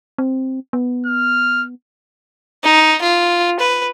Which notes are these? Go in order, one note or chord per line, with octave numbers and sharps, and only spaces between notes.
C4
B3
F6
D#4
F4
B4